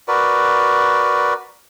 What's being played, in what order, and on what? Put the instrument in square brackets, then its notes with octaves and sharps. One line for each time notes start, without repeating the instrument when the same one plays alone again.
[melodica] F#4 A#4 B4 D5